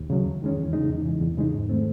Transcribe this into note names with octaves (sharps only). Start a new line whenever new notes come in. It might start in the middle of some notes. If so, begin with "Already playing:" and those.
Already playing: D#2
C#3 F#3
E2
D#3 G#3 C#4
E2
C#3 G#3 D#4
E2
C#3 E3
E2
C#3 G#3 D#4
G#2
D#3 A3 C4